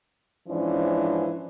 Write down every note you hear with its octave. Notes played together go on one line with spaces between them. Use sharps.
G#2 E3 F3 C#4 D4